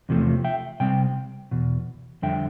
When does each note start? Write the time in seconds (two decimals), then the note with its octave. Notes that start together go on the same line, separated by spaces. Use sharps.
0.09 E2 C3 F3 A3
0.44 E5 G5
0.80 C3 G3 C4 G5
1.51 E2 B2
2.22 F2 D3 G3 E5 G5